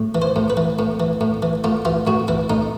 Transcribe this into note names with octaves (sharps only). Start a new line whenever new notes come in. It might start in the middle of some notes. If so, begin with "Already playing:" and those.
Already playing: A2
E3
C5
A2
B4
E3
A2
E3
A2
E3
A2 F4
E3 F4
A2 F#4
E3 E4
A2 D#4